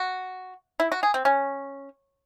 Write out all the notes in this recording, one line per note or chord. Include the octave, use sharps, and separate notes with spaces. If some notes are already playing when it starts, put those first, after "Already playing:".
Already playing: F#4
E4
F#4
G#4
C4
C#4